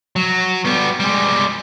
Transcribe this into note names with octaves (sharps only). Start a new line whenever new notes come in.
F#3
G3 B3
G3 G#3